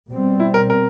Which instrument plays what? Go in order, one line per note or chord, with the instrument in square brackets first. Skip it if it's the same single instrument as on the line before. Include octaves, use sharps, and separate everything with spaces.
[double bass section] B2 G3 C4
[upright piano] E4
A#4
A#4